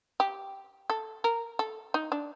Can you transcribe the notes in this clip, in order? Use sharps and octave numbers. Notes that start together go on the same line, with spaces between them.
G4
A4
A#4
A4
D#4
D4